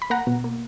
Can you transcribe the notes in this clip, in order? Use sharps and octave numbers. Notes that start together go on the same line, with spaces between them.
B5
A#3 F#5 A#5
B2
A#3